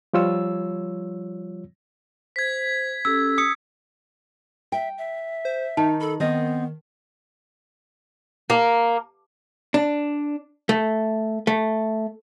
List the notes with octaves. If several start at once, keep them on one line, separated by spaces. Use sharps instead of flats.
F3 G3 F4 C#5 E6
C5 G#6 B6
C#4 G4 A4 E6
D#6 C#7
E5 G5
E5
C5
D#3 D#4 A5
A4 B5
D#3 B3 C4 D#5
A#3
D4
A3
A3